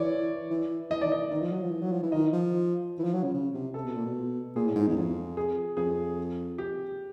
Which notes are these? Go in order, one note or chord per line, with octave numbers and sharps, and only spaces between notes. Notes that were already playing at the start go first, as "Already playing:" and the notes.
Already playing: E3 C#5 D5
E3
E3 D#5
D#3 D5
E3 D#5
D#3
F3
F#3
F3
E3
F#3
F3
E3
D#3 D#5
F3
E3
F3
F#3
C#3
C#3
C3
C3 A4
B2
A#2
B2
A#2 G#4
A2
G#2
E2
F2
G#4
F2 G#4
G4